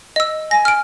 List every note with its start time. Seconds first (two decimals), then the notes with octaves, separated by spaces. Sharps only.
0.16 D#5 E6
0.51 G#5 A#6
0.65 F6 D7